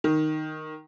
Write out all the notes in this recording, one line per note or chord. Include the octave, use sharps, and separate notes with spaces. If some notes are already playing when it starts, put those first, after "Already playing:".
D#3